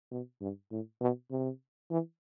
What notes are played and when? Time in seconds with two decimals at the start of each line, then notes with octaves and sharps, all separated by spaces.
0.11 B2
0.41 G2
0.71 A2
1.01 B2
1.31 C3
1.90 E3